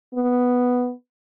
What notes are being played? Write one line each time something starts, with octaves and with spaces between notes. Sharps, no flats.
B3